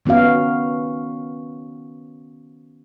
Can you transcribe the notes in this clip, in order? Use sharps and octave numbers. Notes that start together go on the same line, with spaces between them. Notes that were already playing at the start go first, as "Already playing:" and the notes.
D#3 B3 C#4 F#4 F5